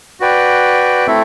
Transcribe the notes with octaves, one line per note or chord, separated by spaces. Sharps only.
F#4 B4 D5 G5
A3 C4 E4 A4 E5